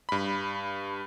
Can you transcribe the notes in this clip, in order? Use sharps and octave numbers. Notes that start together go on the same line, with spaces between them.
G2 B5